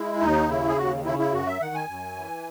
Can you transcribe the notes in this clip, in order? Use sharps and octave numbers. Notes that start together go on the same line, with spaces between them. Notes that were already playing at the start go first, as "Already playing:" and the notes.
Already playing: G#3 E4
D#2 D#4
C#3 E4
G#4
D#2 F#4
C#3 E4
E4
F#2 F#4
E5
D#3 F#5
G#5
F#2
E3